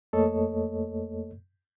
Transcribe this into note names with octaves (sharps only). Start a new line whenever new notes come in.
F2 A3 A#3 A4 C#5 D#5